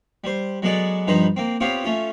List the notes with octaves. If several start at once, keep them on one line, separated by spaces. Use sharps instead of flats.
G3 C5
F#3 G#3 B3 A4 D5 A5
G2 F3 D#4 B4 C5 A#5
A#3 C4
B3 C4 F4 G4 C#5 F5
A3 C#4 F4